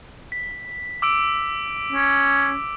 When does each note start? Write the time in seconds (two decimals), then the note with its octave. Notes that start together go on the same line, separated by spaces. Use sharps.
0.32 B6
1.02 D6 E6 D7
1.92 C#4